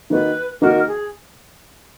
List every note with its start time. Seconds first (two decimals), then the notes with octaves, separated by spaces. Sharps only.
0.10 D#3 A#3 D#4 F#4 B4
0.61 D#3 A#3 D#4 F#4 A#4
0.87 G#4